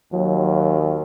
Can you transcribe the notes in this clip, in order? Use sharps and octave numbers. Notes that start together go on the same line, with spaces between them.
D#2 F#3